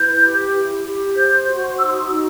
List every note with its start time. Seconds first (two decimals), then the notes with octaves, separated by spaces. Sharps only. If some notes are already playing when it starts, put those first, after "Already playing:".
Already playing: E4 B4 G6
0.23 G4
0.54 E4
0.84 G4
1.15 C5 G6
1.47 F#4
1.77 D#4 E6
1.86 C6
1.93 D#6
2.08 D#4 E6